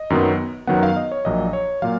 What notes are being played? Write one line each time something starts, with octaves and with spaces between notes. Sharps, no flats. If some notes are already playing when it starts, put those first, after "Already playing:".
Already playing: D#5
F#2 D#3 F#3 B3
F#2 D#3 F#3 B3 F#5
F5
D#5
C#5
A#1 A#2 F#3 D#5
C#5
A#2 F#3 F5